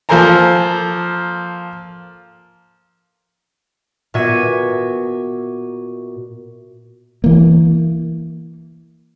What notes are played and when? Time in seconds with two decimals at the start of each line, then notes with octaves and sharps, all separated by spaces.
0.09 F3 A#3 A4 C5 G#5 A#5
4.14 A#2 B3 F#4 E5 G#6 D#7
7.24 E3 A#3